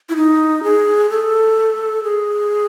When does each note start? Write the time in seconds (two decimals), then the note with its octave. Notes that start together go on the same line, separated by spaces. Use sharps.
0.09 E4
0.16 D#4
0.63 G#4
1.10 A4
2.03 G#4